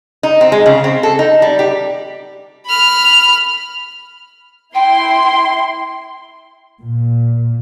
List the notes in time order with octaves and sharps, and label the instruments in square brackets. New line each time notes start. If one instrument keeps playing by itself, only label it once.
[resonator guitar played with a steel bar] D#4
C4
G#3
C#3
C4
A4
D#4
G3
G4
[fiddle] B5 F6
[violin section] E4 C6 [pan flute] G5
[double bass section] A#2